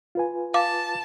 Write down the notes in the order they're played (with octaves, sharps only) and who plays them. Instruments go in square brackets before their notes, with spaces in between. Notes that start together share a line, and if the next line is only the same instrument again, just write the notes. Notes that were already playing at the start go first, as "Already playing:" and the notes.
[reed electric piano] F4 B4 G#5
[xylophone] F5 D6 [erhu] A5